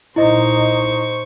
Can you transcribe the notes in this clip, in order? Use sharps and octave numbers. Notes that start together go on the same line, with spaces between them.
A#2 D#4 E4 C5 D#5 C#6